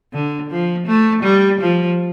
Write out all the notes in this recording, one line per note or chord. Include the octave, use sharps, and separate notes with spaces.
D3
F3
A3
G3
F3